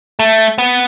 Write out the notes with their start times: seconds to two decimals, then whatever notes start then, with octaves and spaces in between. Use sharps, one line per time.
0.19 A3
0.58 B3